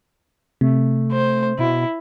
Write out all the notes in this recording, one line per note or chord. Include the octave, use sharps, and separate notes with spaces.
C3 A3
C5
B2 E4